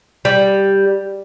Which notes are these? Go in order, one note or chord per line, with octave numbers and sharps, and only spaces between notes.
G3